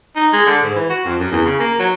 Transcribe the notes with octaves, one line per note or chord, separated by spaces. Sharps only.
D#4
G#3
D3
G#2
E3
F#4
F2
F#2
E2
C#3
A#3
F#3